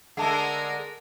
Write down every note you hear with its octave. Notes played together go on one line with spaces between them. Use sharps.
D3 G#3 A3 A#4 F#5 A5 A#5